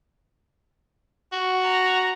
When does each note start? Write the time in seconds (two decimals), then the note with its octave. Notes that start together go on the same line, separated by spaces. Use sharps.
1.33 F#4
1.63 A#5